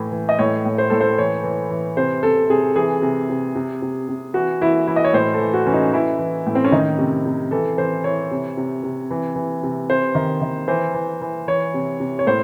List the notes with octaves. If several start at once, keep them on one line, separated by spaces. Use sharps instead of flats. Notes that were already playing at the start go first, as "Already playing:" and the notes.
Already playing: A2 E3
E3
D#5
A2 C#5
A2
C5
A2 A4
C5
E3 C#5
E3
E3
C3 C5
C3 A4
C3 G#4
E3 G#4
C3
C3
C3
C3
C3
E3 F#4
E3 E4
E3 E4
D#5
C#5
A2 C5
A4
E3
F#4
E3 C#4
D#4
E3 E4
E3
A2
C4
C#4
D#3 D#4
C3
C3
E3 A4
E3 C5
E3 C#5
C3
C3
C3
E3
E3
C3
C3 C5
D#3
D#3
E3 C5
E3
E3
E3 C#5
C3
C3
C#5
A2 C5